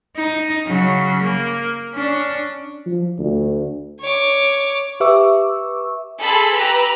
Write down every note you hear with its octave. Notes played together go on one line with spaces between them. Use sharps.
D#4
C#3 F#3
A#3
C#4 D4
F3
D2
C#5 D6
G4 B4 E5 C#6 D6 E6
G#4 A4 B5 C6
G4 B4 A#5 E6